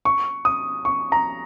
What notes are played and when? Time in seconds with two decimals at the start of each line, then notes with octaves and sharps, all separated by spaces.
0.05 C#6
0.45 D#6
0.85 C#6
1.12 A#5